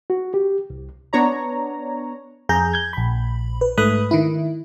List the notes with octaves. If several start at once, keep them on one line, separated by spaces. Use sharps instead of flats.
F#4
G4
C2
B3 D4 C#5 A#5
F2 G#4 A#5 G6
G6 G#6
A#1 B5
B4
G#2 A3 B4 B5 D#6 F#6
D#3 E4